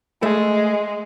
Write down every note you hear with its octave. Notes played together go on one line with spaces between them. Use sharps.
G#3 A3